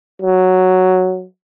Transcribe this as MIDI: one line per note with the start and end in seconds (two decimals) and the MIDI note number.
0.22 1.25 54